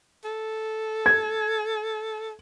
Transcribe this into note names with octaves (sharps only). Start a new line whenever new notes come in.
A4
G#6